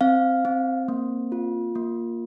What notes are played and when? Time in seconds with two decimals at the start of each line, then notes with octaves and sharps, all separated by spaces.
0.01 C4 F5
0.45 C4
0.88 A#3
1.32 F4
1.75 A#3